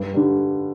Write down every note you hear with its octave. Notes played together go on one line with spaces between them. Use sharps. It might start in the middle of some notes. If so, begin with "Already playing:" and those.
Already playing: G2
D3 G3